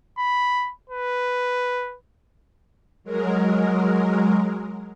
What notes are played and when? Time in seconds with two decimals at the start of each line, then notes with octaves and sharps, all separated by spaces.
0.18 B5
0.90 B4
3.04 F#3 G#3 A#4